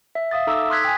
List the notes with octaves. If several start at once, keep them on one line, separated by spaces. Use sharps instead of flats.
E5
E5 F5 D#6 A6
D#4 A4 A#5 D6 E6
C6 D#6 F6 F#6 G#6 B6
G5 G#5